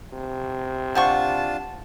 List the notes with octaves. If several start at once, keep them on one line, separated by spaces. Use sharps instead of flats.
C3
D4 F4 C5 F#5 A5 C#6